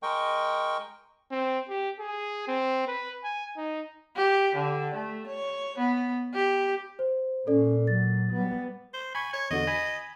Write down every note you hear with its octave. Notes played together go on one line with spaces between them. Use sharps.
G#3 A#4 D#5 G5 C#6
C4
G4
G#4
C4
B4
G#5
D#4
G4
D3
A3
C#5
B3
G4
C5
A#2 C#4 A4 D5
F#3 A6
G3 B3
C5
G#5 B5 C#6
C#5 G#6
E2 D3 F#4 D#5
G#5 B5